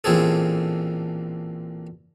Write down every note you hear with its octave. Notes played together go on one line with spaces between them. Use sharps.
A1 A#2 C4 G#4 A4